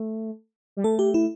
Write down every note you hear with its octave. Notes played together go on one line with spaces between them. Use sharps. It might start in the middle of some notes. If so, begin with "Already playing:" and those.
Already playing: A3
G3
A3 A4
G4
E4